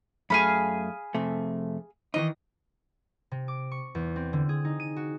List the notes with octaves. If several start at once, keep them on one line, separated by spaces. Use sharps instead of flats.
F#2 A3 G#4 F5 B5
F2 C3 A3
D#3 E3 D#4 D#5
C3
D6
C#6
E2
C4
D3
G#4
D#4
D#7
F#4